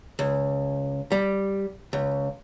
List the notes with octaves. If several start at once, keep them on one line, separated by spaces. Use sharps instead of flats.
C#2
G3
C#2